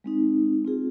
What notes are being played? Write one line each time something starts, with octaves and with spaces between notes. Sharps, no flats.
G#3 C4 D#4
C4 F4 G#4